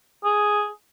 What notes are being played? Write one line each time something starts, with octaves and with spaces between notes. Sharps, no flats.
G#4